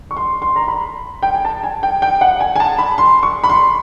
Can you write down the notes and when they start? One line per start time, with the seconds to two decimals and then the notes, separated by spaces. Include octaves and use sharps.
0.11 C#6
0.17 C6
0.42 C6
0.56 A#5
0.68 B5
1.23 G5
1.34 G#5
1.45 A5
1.63 G#5
1.83 G5
2.02 G5
2.21 F#5
2.40 G#5
2.56 G#5
2.60 A5
2.79 B5
2.98 C6
3.23 C#6
3.44 B5
3.50 C6